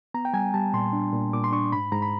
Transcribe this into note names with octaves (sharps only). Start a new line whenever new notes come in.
B3 A#5
G5
G3 G#5
G3 A5
A#2 C6
D4
A#2
A#2 D6
C6
D4 C#6
G#2 B5
G#2 A#5
B5